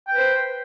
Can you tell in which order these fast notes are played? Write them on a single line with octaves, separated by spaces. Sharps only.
G5 B4 C5